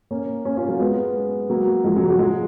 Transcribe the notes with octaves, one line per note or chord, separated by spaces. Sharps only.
A#3 C#4
A#3 C#4
C#4 F4
F#3 A#3
G#3 B3
F#3 A#3
F3 G#3
F#3
F#3
F3 G#3